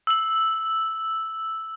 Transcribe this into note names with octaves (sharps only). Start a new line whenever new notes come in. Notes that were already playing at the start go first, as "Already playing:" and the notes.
E6 F#7